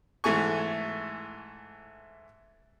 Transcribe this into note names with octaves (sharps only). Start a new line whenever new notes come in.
G#2 E3 A3 G#5 C#6